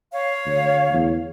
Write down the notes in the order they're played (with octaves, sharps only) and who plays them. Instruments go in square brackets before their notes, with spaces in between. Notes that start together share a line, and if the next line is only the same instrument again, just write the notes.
[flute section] C#5 F5
[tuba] D2
E2